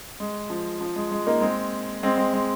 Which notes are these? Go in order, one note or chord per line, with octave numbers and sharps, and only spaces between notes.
G#3
F3
F3
G#3
G#3
A#3 D#4
G#3 C4
G#3 C4
G#3 C4
G#3